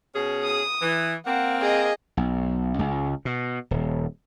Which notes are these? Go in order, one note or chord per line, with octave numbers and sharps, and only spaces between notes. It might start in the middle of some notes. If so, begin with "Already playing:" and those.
B2 C#4 G#4
D#6
E3
A#3 C4 F#5
G#4 D#5
B1
C#2
B2
D#1